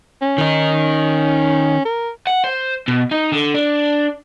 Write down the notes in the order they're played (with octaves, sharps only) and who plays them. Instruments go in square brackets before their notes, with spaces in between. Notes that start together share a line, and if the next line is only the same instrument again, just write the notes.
[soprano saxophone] C#4
[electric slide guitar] D#3 D#4
[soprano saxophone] A#4
[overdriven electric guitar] F#5
C5
B2
D#4
D3
D4